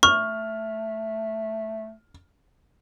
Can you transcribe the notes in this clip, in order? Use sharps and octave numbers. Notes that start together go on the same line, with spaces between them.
A3 C#6 F6